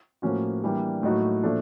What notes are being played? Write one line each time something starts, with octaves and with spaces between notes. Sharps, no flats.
A2 F3 A#3 C#4 F#4
E3 G3 A#3 D4
A2 F#3 A#3 D#4 F#4
A#2 F3 A3 D4